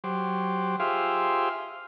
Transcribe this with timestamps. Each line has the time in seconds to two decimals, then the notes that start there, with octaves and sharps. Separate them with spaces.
0.04 F#3 G4 C5
0.80 F4 G4 G#4 C5 E5 F5